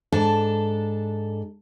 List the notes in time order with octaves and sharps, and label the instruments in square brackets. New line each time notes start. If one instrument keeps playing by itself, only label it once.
[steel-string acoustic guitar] G#2 D4 A4 A5